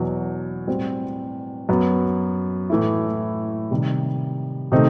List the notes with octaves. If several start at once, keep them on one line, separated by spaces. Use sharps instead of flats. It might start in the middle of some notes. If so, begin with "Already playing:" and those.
Already playing: E2 B2 F#3
A2 G3 C4 F#4
F#2 F#3 B3
A2 E3 A3 E4
C3 D#3 G3
C3 D#3 A3 C4 D#4